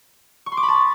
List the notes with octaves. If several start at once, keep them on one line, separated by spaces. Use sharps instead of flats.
C#6
C6
D6
B5
A5